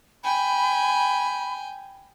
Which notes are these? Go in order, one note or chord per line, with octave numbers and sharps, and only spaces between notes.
G5 G#5 B5